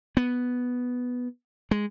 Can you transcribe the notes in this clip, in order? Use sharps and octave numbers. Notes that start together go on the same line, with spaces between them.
B3
G#3